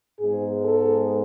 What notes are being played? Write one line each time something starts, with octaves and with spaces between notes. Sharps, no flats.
G#2 G#3 B3 G#4
A4